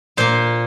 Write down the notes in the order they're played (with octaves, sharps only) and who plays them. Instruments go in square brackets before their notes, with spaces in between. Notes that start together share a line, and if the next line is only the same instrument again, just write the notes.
[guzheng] A#2 A#3 C5